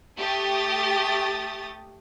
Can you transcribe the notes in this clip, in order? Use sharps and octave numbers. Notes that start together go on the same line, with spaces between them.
A3 G4 D#6 A6